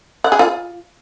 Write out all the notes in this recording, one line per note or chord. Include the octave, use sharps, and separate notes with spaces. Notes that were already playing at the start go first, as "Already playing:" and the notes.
F#5
G#4
F4